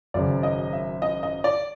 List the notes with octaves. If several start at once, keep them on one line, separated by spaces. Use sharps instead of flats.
G#1 F#2 C#3 D5
D#5
E5
D#5
D#5
D5